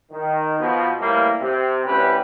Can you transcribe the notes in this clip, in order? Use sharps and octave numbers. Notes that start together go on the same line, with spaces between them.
D#3
B2 F3
A2 E3 G3 A#3
C3
D2 C#4 E4 G4 B4